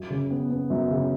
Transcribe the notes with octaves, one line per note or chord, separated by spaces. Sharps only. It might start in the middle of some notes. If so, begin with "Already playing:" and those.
Already playing: F#2
C#3
B3
B3
F#2
C#3